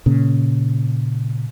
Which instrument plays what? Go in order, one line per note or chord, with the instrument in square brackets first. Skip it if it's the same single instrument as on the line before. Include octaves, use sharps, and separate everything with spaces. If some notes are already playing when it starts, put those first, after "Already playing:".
[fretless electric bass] A#2 C#3